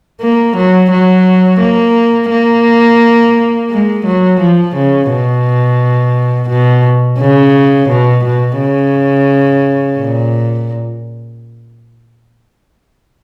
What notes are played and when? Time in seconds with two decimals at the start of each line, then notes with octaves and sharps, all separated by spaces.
0.21 A#3
0.57 F#3
0.91 F#3
1.60 A#3
2.31 A#3
3.70 G#3
4.05 F#3
4.40 F3
4.75 C#3
5.10 B2
6.49 B2
7.18 C#3
7.89 B2
8.24 B2
8.58 C#3
9.98 A#2